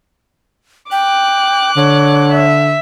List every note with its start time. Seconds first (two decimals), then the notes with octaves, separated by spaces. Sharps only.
0.92 G5 D6 F#6
1.77 D3 C#5
2.32 E5